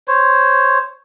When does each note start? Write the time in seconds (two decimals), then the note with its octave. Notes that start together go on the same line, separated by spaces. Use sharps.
0.08 C5 C#5